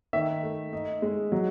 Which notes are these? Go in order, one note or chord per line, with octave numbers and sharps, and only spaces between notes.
D#3 E5
A3
D#4
G#3
F#3